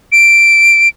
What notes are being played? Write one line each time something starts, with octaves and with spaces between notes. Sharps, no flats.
D7